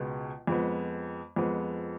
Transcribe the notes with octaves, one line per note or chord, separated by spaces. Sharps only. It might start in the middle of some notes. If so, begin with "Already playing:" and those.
Already playing: C#2 B2 G#3 B3
F2 F3 G#3 B3
F2 F3 G#3 B3